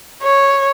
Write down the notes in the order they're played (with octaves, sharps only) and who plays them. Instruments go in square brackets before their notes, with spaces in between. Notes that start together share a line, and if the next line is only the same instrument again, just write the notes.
[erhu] C#5